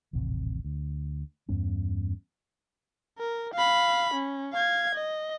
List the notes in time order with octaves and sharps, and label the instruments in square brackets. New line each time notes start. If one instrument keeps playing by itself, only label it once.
[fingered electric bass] D#1 A1 C3
D2
E2 G2 B3 C#4
[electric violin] A#4
F5 B5
C#4
F5 G#6
D#5